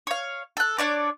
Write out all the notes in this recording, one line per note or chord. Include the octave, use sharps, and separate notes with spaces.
C#5 F5
A4 F#6
D4 C#5 D5